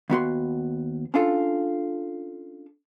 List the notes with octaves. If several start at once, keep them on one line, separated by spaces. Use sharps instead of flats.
D#2 B3 F#4 C6
C#4 D4 F4 A4